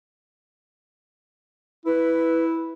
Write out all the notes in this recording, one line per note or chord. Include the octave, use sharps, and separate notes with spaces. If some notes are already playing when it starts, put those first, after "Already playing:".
E4 B4